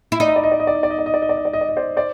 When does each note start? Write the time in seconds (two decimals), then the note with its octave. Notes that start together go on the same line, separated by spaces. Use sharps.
0.12 E4
0.20 D#4 D5
0.28 D#5
0.36 D5
0.44 D#5
0.52 D5
0.60 D#5
0.67 D5
0.75 D#5
0.83 D5
0.91 D#5
0.99 D5
1.06 D#5
1.14 D5
1.22 D#5
1.29 D5
1.37 D#5
1.45 D5
1.53 D#5
1.61 D5
1.69 D#5
1.77 C5 D5
1.97 C5 D5